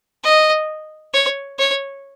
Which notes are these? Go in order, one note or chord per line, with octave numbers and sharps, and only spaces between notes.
D#5
C#5
C#5